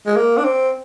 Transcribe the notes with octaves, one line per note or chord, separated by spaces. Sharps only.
G#3
A#3
D4
C4